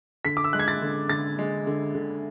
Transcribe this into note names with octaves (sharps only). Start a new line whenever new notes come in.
D3 B6
D6
E6
G#3 F#6
G#6
A6
D3
D3 A6
G#3
D3
D3